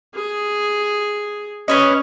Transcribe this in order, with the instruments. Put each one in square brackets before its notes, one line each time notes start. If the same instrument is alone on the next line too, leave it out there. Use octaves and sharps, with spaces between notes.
[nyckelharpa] G#4
[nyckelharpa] C#4 [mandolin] B4 C#5 D#5